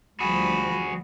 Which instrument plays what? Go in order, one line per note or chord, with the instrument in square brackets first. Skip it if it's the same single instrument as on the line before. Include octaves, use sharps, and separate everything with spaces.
[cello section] D2 F3 G3 [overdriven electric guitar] F#4 G#4 [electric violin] B5